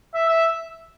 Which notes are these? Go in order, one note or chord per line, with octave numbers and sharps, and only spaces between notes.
E5
E5